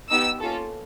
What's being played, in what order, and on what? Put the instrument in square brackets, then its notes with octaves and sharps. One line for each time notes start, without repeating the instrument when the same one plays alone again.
[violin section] B3 D#4 G4 E6
A#3 C#4 F4 A4